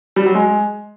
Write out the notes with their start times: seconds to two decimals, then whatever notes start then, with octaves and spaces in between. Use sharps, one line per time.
0.16 G3
0.26 F#3
0.35 G#3